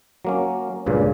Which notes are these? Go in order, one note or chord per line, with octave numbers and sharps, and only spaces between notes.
F#3 A#3 C#4
C#2 G2 A#2 C#3